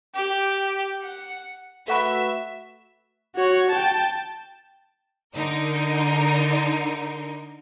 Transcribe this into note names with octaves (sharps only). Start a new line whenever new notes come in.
G4
F#5
A3 F#4 B4 E5
F#4 C#5
G5 A5
D3 D#4 A#4